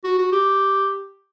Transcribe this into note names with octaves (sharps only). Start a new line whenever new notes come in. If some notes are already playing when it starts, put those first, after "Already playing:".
F#4
F#4
G4